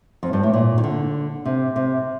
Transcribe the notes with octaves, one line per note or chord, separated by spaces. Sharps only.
F2
G2
A2
A#2
D#3
D3
C3
C3